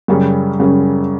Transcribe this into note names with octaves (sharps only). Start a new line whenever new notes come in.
F#2 C#3 G3 C#4
F#2 C#3 G3 C#4